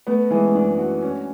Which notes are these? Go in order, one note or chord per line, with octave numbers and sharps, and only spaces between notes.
A3 B3
E3 G#3
C#4
F#2 D4
F#4
C#4